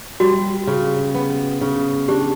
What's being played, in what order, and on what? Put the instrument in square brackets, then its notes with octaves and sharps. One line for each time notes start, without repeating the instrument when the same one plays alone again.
[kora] G3 [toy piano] F#4
[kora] C#3
B3
C#3
[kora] D4 [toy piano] G4